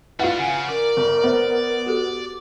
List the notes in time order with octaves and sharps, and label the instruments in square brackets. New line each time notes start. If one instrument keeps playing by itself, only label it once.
[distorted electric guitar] G3 D4 [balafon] E4 B4 E5 [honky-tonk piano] F4 F#5
[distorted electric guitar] C#3 [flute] G#5
[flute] A#4 [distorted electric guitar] D5
[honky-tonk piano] G1
[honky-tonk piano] B3 [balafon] C5 E5
[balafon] F#4 G4 A4